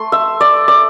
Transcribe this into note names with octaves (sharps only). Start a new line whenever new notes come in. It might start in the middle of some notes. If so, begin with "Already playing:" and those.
Already playing: A3 C6
E5
D5
D5